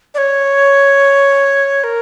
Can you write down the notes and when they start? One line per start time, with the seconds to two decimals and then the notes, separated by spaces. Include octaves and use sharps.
0.14 D5
0.18 C#5
1.84 A#4